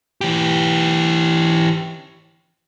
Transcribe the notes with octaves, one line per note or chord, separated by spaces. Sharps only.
E3 G4